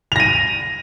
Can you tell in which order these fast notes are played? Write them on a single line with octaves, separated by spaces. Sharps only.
F7 A#6 D#7